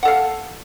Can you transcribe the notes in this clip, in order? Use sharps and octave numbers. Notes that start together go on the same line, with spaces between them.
A4 F5 F#5